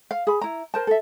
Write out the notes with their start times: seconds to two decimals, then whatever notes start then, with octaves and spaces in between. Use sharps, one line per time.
0.11 F5
0.27 G#4 B5
0.41 E4 A#5
0.74 A#4 C5 A5
0.87 A4 E5